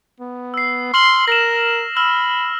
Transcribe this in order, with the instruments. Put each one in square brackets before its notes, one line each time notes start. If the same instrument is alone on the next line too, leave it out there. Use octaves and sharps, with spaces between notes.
[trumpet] B3
[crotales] E6 C7
[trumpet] C6 [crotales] F6 F#7
[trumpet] A#4 [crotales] A#6 E7
[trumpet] B5 [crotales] E6 F6 F#7